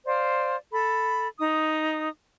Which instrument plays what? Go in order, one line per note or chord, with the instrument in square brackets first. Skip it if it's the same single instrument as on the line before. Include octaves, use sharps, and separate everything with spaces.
[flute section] C5 D5 F5
A4 B5
D#4 D#6